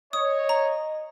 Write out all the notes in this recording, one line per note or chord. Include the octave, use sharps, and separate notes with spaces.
C#5 D#5 D#6
A#5